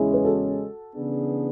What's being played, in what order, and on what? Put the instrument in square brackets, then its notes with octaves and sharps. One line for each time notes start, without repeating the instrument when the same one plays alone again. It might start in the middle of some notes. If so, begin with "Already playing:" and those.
Already playing: [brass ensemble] E2 C#3 G#3 C#4 [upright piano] E4 G#4
[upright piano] B4
F#4 A4
[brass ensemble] C#3 E3 B3 D4 G#4